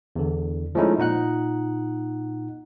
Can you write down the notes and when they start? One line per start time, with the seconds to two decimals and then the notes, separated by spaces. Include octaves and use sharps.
0.16 E2 D3
0.75 F3 G#3 A3 C#4 D#4 E4
0.98 A#2 D#4 F#5 F#6